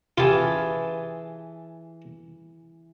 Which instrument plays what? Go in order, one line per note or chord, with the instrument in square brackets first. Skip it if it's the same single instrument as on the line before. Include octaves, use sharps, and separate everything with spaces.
[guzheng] E3 G#4 A5 [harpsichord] F4 G4